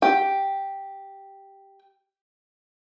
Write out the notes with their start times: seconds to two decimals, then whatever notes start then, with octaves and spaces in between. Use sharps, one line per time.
0.02 G4 G5